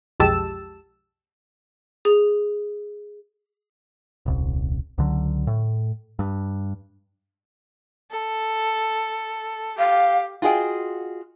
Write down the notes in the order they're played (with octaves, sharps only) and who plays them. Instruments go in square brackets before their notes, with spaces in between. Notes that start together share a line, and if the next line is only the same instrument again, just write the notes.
[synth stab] B1 F2 G#3 G4 A5 E6
[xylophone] G#4
[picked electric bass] D#1 C2
C#2 D3 F#3
A2
G2
[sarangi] A4
[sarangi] G4 [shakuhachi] F5
[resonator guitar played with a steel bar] F4 F#4 G#4 D#5 G5